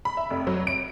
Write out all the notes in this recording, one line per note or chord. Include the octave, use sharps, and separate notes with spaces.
B5
E5
F1
F#3
D7